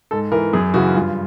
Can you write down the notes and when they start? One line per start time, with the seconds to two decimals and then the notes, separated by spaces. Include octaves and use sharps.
0.11 G#2 A4
0.32 E3 A#4
0.53 F#2 G#4
0.74 C#3 E3 F#4
0.95 G2 F4